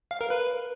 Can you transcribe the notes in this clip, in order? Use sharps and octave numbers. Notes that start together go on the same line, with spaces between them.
F5
A#4
B4